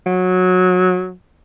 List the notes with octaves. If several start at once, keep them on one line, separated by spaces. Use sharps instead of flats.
F#3